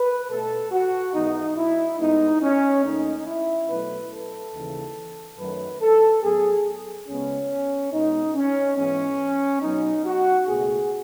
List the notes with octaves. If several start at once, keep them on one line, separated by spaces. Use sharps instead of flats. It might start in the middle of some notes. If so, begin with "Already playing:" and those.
Already playing: B4
B2 A3 A4
F#4
G#2 E3 B3 D#4
E4
A2 G#3 B3 D#4
C#4
D#2 D#3 A3 D#4
E4
B2 F#3 A3 B4
A4
D#2 C#3 E3
F#2 D#3 F#3 A3 B4
A4
A2 F#3 B3 G#4
C#2 C#3 G#3 B3 C#4
B2 G#3 B3 D#4
C#4
G#2 E3 G#3 B3 C#4
B2 F#3 B3 D#4
F#4
C#2 B2 A3 G#4